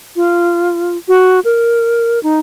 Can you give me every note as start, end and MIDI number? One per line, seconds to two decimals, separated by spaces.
0.16 0.97 65
1.08 1.40 66
1.44 2.19 70
2.23 2.39 63